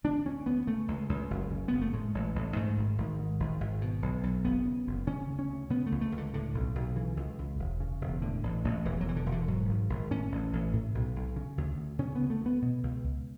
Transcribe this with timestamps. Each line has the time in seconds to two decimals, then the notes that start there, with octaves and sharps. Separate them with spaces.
0.04 D3 D4
0.25 D2 C#4
0.46 D2 B3
0.67 C#3 A3
0.88 C#2
1.09 C#2
1.31 F#1
1.51 C#3
1.68 F#1 B3
1.81 A3
1.93 A2 G#3
2.14 A1
2.35 A1
2.56 G#2 A3
2.77 G#1
2.98 G#1
3.19 G#2
3.40 G#1
3.61 G#1
3.81 B2
4.02 B1
4.23 B1
4.45 F#1 B3
4.65 C#3
4.87 F#1
5.07 C#3 C#4
5.29 D2
5.39 C#4
5.49 D2
5.70 C#3 B3
5.86 A3
5.92 C#2
6.01 A3
6.12 C#2
6.18 D3
6.34 A2 D3
6.54 B1
6.75 B1
6.96 C#3 E3
7.17 C#2
7.39 C#2
7.59 E1
7.80 C#3
8.01 E1
8.22 A2 D3
8.43 A1
8.64 A1
8.85 E1 E3
9.01 F#3
9.06 B2 E3
9.16 D3
9.26 E1
9.32 D3
9.48 G#2 F#3
9.69 G#1
9.89 G#1
10.11 A2 C#4
10.32 A1
10.53 A1
10.73 A2
10.95 B1
11.16 B1
11.36 C#3
11.58 D2
11.78 D2
11.99 C#3 C#4
12.15 B3
12.20 D2
12.30 A3
12.41 D2 B3
12.62 B2
12.83 C#2
13.04 C#2